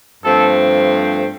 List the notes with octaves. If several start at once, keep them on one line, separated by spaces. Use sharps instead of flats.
G2 F3 A3 C4 A4